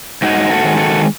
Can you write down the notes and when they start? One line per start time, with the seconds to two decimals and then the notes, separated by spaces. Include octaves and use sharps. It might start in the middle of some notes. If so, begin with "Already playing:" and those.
0.22 G#2 D#4 F#4
0.50 F#4 A4
0.64 D#3 G#3
0.77 F#4 A4